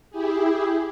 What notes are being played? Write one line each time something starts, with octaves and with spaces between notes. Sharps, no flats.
E4 G4 G#4